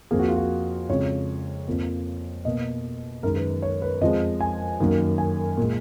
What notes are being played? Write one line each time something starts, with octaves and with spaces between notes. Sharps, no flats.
F2 F3 A#3 G#4
F#4
F4
F#4
F2 C#3 G#3 C#5
F2 F3 A#3
B2 A#3 D#5
F#2 D#3 G#3 A#4
B4
C#5
B4
F2 F3 G#3 D#5
G#5
F#2 D#3 F#3 A#3
G#5
A#2 G#3